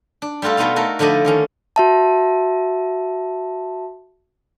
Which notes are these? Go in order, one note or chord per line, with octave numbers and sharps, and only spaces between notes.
D4
G3 A3 F4 F#4 A4
B2 A3 B3 D#4 F4 F5
A3 D#4 F#4 A4 A#4
D3 F3 A3 D4 D#5 B5
D3 D#3 C#4
F#4 E5 A5